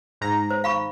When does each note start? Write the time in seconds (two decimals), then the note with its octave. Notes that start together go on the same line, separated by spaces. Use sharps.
0.21 G#2 A#5
0.50 C5
0.64 F5 B5 C#6